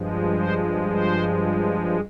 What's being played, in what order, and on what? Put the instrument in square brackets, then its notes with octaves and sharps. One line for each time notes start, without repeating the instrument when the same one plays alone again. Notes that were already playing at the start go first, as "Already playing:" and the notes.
Already playing: [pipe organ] G2 F3 G#3
C5
C5